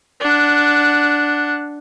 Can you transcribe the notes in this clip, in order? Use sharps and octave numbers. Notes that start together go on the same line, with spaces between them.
D4 F#5